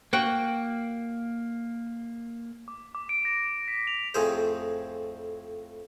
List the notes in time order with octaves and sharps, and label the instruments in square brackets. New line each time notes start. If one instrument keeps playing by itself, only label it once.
[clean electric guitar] A#3 [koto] F#4 F#5 G5
[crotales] D6
D6
D7
A#6
B6
F7
[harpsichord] F2 A2 G#4 C5